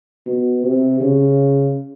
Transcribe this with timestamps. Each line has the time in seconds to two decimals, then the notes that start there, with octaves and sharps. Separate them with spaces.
0.26 B2
0.63 C3
1.00 C#3